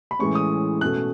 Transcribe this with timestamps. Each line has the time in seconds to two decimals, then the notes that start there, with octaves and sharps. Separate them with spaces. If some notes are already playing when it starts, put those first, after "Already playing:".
0.11 B5
0.19 A2 E3 G#3 C#4 C#6
0.35 D#6
0.81 B2 A3 C#4 F#6